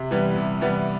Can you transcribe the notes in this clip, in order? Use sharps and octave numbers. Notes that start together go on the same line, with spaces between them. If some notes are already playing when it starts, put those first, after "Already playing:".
Already playing: C3
E3 G3 B3
C3
E3 G3 B3